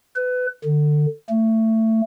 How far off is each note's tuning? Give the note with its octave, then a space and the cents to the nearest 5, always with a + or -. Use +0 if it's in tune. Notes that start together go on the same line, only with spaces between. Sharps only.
B4 +25
D3 +25
A3 +20